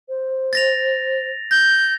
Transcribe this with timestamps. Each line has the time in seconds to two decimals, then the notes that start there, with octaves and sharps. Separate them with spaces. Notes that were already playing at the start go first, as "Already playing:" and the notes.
0.09 C5
0.53 A6 A#6 F7
1.51 G6 A#6